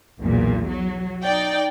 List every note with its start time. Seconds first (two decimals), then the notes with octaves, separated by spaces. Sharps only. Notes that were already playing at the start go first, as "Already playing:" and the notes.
0.19 B1 E2 A#2
0.66 F#3
1.23 D#4 D5 G5